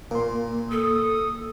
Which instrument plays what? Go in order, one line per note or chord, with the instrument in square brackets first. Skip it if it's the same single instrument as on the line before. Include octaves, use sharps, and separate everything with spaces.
[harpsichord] A#2 [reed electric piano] A#3 C6
[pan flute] A4 [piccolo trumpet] D#6